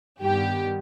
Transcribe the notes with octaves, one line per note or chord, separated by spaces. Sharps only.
G2 D#3 G3 B3 G4